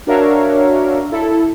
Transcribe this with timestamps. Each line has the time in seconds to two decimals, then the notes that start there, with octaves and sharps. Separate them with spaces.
0.07 D4 F#4 A#4 C#5 E5 F5
1.11 E4 A4